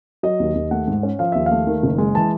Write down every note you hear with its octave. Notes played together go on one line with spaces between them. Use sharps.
F#3 D#5
D#2
D#2
A3 F#5
G#2
C#4
F3 F5
D#2 E5
F5
A3
D#3
F#1
G#3
E3 A5